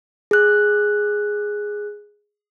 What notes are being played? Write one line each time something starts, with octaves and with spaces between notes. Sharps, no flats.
G#4 F#6